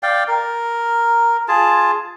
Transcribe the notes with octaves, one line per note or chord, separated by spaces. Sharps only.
D5 F5 G5
A#4
F4 G#4 A5